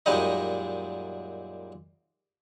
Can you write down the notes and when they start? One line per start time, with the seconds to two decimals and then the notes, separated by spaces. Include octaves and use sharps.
0.06 F#2 A#2 G3 G#3 D#4 D#5